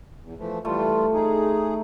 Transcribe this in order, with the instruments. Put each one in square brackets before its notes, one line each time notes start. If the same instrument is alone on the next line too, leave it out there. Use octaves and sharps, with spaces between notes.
[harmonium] E2
E3 F3 A3
[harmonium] E3 G3 F4 [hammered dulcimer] A3
[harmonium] D#4 G#4